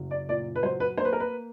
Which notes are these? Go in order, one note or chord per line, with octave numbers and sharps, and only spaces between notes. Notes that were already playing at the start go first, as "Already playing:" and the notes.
Already playing: F#1 F#3
D5
A#2 D5
B4
F#3 C5
B4
A#3 C5
B4
A#4
B4